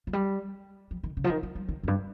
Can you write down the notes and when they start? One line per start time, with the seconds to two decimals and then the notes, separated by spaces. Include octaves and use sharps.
0.07 F3
0.13 G3
0.91 F3
1.04 D#3
1.17 C#3
1.24 F3
1.30 D#3
1.43 F3
1.55 G3
1.69 D#3
1.83 F2
1.88 G2